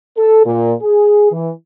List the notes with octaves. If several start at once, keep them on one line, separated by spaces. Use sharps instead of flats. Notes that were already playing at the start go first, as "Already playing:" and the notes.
A4
A#2
G#4
E3